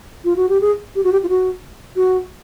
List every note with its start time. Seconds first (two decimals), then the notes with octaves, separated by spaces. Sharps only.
0.25 F4
0.36 F#4
0.49 G4
0.61 G#4
0.96 G4
1.04 F#4
1.12 G4
1.24 F4
1.29 F#4
1.96 F#4